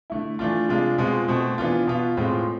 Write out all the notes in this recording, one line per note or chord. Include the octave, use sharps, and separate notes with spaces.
D3 A3 E4
E3 A3 D4 F4
C3 G#3 D4 F4
B2 G#3 C4 F4
B2 A3 C4
E3 B3 D4 F4
B2 B3 F4
A2 G#3 C4 F4